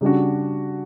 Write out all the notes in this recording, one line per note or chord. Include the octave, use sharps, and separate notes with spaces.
C#3 G3 D4 F#4